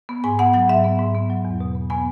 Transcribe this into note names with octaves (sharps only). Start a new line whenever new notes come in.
B3
G#2 G#5
B3 F#5
F#3 F#5
G#2 E5
B3
G#2
B3
F#3
E2
B2
B3
B3 G#5